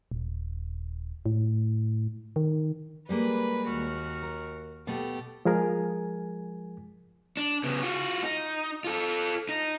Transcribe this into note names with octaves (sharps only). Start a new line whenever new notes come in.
D#1
A2
D#3
G3 G#3 A#3 B4 B5
D#2 F#4 F6
A#4
B2 A3 G4 A4
F3 G#3 G#4 A#4 G#5
D4
C#3 B3
F4 F#4
D#4
F4 A4
D#4